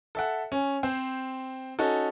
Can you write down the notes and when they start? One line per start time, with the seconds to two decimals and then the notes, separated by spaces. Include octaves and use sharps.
0.15 A4 E5 F#5
0.52 C#4
0.83 C4 C5
1.79 C#4 D#4 F#4 A4